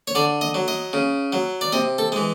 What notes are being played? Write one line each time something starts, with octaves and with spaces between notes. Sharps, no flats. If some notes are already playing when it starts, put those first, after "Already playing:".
C#5
D3 D5
D#5
F#3
D#5
C#3
F#3
D5
C3 D#5
A4
E3 G#3